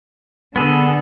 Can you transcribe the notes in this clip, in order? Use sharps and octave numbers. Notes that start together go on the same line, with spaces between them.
D3 B3 G#4 A4